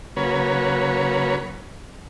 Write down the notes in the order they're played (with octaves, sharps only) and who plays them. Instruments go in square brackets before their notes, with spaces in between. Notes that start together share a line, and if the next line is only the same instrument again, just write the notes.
[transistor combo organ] C#3 F#3 A#3 B4 C#5